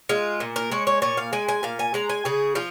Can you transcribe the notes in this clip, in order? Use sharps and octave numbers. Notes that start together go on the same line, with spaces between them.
G#3 F4
A#2
A#4
G#3 C#5
C#5
A#2 C#5
F5
G#3 G#5
G#5
A#2 F5
G#5
G#3 A#5
G#5
C#3 G#4
F3 F4